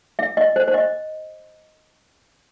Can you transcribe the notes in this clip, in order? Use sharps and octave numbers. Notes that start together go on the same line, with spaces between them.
E5
D#5
C5
C5
D#5